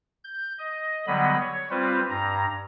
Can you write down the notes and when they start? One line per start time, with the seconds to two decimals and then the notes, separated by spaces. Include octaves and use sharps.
0.24 G6
0.58 D#5
1.07 D3 F#3 G3 B3 D#5 B5
1.40 C#5
1.70 G3 C4 F4 B4 C5
2.10 G2 A#5